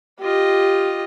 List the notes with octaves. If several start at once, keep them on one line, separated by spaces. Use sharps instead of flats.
F4 G4 D#5